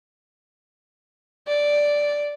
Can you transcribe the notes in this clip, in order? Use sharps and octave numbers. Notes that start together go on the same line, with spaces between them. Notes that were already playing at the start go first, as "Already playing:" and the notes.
D5